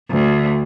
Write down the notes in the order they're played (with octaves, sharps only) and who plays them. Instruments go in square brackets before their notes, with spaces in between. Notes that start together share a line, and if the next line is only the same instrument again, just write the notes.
[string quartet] D2